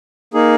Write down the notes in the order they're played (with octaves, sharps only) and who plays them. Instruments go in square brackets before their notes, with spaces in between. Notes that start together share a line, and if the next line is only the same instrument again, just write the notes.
[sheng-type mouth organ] A#3 D#4 G#4